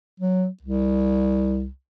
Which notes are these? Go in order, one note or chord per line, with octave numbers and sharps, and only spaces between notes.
F#3
C2